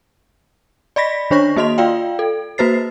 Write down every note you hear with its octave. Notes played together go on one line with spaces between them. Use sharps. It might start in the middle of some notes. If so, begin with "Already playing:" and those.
D5 D#5 B5 A#6 B6
D#3 D4 C5 C#5 C#6 A#6
A#3 F#4 D#5 C6 F7
F4 D5 F5 G5
A4
A#3 F#4 B4 C5 A6 C7